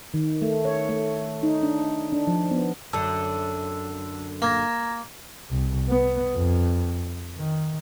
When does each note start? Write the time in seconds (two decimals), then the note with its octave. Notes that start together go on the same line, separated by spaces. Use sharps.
0.14 D#3
0.42 A3
0.65 C#5
0.89 A3
1.43 D#4
1.63 D4
2.13 D4
2.27 F3
2.51 B3
2.93 F#2 D3 A5 E6
4.42 A#3 A#5 G#6 A#6
5.51 C2
5.89 B3
6.36 F2
7.37 D#3